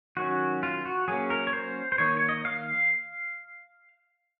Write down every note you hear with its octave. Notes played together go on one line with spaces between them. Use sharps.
D#3 F#3 C#4 F#4
F4
F#4
F#3 A#3 C#4 G#4
A#4
C#5
C5
C5
D#3 A#3 D#4 C#5
C#5
D#5
F5